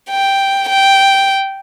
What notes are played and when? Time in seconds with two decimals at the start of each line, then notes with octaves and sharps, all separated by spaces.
0.10 G5
0.69 G5